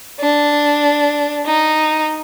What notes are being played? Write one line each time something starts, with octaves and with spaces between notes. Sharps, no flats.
D4
D#4